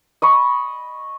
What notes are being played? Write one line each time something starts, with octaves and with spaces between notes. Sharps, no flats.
D#5 B5 C#6